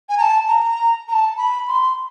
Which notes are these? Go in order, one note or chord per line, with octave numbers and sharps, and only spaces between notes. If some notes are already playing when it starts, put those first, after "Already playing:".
G#5
A#5
A5
A#5
A#5
A5
B5
C6